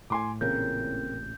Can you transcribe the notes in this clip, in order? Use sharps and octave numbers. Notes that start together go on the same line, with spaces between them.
A2 G#5 C6 D6
A1 A#2 C#3 C4 A#4 G6